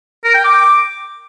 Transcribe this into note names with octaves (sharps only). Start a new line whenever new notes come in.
A#4
G5
D6